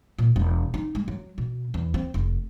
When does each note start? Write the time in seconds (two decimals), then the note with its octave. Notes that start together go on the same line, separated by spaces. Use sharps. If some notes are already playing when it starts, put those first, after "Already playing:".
0.18 A#2
0.36 E1
0.74 D#4
0.95 G#3
1.08 F#3
1.38 B2
1.74 E2
1.94 C4
2.14 F1